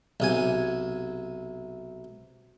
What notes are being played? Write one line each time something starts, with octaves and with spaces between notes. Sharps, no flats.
B1 C3 G#5